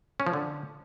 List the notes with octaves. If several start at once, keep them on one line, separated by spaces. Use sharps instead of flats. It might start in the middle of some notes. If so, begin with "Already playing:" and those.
C#4
F3
D3